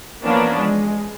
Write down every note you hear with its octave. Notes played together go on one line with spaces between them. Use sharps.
E3 F3 A#3 B3 C#4 D4
G#3